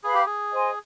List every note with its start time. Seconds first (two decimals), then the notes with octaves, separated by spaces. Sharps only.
0.04 G#4 B4 F5 B5
0.14 G4
0.26 G#4
0.53 C5 D#5 G#5 C6